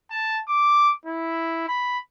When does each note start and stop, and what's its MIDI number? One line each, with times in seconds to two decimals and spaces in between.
0.11 0.40 81
0.48 0.92 86
1.05 1.65 64
1.67 1.99 83